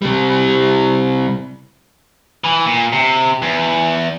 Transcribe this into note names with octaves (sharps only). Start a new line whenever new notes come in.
C3 G3
E3
A#2
C3
E2